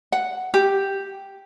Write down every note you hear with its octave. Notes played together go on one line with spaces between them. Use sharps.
F#5
G4